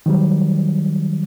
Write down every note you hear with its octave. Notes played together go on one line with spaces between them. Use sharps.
D#3 F#3 G3